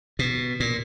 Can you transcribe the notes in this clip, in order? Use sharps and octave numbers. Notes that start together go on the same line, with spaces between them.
B2
A#2